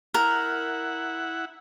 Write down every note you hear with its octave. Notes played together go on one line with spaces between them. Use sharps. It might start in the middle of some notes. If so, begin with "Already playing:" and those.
E4 A#4 F#5